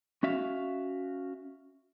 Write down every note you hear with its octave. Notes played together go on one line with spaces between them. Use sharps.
C#4 F#4 E5 F5